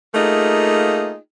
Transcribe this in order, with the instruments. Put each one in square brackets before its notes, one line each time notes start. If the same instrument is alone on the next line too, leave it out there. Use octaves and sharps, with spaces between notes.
[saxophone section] A3 A#3 D#4 F4 G#4